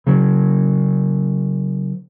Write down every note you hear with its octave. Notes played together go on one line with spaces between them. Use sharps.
C#3 F#3